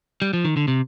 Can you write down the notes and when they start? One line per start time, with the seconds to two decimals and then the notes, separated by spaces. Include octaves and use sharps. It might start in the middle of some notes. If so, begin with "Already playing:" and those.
0.22 G3
0.33 F3
0.45 D#3
0.57 D3
0.68 C3